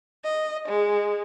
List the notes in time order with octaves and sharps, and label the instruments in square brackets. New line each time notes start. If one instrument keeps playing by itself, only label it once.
[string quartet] D#5
G#3